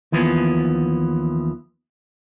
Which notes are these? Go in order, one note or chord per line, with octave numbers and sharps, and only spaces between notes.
D#2 E3 F3 B3